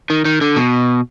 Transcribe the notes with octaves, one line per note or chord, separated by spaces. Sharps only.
D#3
D#3
D3
B2